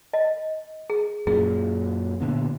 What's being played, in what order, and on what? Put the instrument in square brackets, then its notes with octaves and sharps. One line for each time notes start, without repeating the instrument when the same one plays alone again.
[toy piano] D#5
G#4
[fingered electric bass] F#2 A#2 [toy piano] G#4
[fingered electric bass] A#2 D3 B3